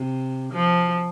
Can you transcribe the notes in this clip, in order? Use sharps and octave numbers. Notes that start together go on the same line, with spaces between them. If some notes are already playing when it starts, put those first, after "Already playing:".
Already playing: C3
F3